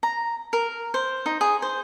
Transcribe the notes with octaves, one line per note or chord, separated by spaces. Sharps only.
A#5
A#4
C5
D#4
G#4
C5